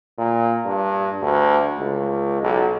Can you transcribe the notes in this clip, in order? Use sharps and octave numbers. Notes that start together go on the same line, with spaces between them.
A#2
G2
D2
C#2
B1